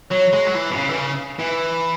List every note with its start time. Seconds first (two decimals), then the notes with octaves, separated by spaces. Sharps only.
0.11 F#3 C#5
0.33 G#3
0.46 F#3
0.54 E3
0.71 B2
0.76 C#3
0.89 E3
0.96 C#3
1.39 E3